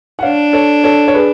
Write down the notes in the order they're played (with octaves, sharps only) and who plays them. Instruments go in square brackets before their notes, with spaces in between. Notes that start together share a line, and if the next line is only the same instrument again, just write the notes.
[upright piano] F#5
[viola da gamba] D4 [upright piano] C#5 F5
[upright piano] A4 C#5
A4 C#5
C#5
G#4 B4